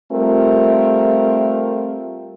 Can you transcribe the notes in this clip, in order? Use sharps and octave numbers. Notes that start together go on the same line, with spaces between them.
G3 A3 C4 F4 A#4